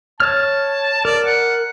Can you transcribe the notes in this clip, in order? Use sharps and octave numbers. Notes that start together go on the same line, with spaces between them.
C#5 A5 F6
A#4 D5
F#5